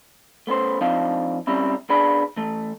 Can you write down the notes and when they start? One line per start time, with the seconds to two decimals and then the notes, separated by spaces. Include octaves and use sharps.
0.47 A3 B3 C#4 C5
0.81 F3 C4 D4 D#4 F5
1.47 G3 C4 C#4 E4
1.90 B3 D4 G#4 D5 B5
2.37 E3 A3